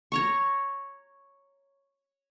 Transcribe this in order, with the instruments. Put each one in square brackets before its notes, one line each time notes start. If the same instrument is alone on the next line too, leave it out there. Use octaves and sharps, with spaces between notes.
[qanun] C#5 A#5 C#6